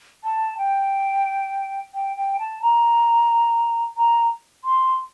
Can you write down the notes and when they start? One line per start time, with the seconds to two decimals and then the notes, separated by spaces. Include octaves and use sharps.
0.24 A5
0.58 G5
1.94 G5
2.17 G5
2.39 A5
2.62 A#5
3.97 A#5
4.65 C6